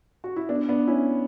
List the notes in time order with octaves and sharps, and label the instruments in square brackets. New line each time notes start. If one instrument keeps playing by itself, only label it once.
[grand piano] F#4
E4
B3 D4
B3 D4
C#4 E4